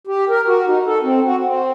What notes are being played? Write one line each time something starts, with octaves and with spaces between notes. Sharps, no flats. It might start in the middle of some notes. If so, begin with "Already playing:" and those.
G4
A#4
F#4
D#4
A4
C4
F#4
C4